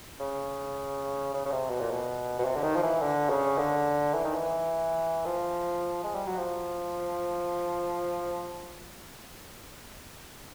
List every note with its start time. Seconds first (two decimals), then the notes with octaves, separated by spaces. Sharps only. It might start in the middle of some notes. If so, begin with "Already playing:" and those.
0.20 C#3
1.34 C#3
1.45 C#3
1.52 C3
1.70 B2
1.80 A#2
1.91 B2
2.39 B2
2.45 C3
2.56 D3
2.64 D#3
2.76 F3
2.83 E3
3.02 D3
3.30 C#3
3.58 D3
4.14 E3
4.24 D#3
4.35 E3
5.25 F3
6.04 G#3
6.15 G3
6.27 F#3
6.38 F3